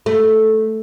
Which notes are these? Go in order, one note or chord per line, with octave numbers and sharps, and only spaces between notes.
A3